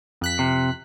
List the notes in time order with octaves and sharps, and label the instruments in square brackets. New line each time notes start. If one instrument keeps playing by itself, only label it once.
[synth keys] F2 F#6 B6
[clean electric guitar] C3